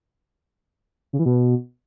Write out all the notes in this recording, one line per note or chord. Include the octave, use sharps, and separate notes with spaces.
C#3
E3
B2